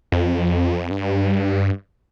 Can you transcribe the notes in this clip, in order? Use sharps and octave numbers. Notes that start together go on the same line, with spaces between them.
F2
G2